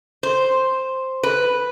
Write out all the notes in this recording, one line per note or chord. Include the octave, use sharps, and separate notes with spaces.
C5
B4